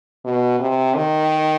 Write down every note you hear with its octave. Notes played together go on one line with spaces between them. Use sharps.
B2
C3
D#3